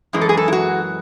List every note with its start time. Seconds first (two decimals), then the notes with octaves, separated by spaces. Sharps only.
0.13 F#2 E3 G#3
0.21 A4
0.29 G#4
0.37 A4
0.48 E4
0.52 F#4